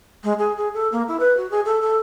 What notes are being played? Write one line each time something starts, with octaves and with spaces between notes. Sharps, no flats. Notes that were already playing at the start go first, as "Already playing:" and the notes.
G#3
G#4
G#4
A4
A#3
E4
B4
F#4
G#4
A4
A4